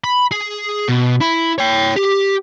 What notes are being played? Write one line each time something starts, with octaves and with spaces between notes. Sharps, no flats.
B5
G#4
B2
E4
C#5 G5
G4